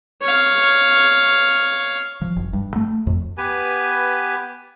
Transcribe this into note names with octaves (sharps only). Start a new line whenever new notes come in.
C#5 F5
F3
F#1
G2
A3
F2
B3 G4 B4 G#5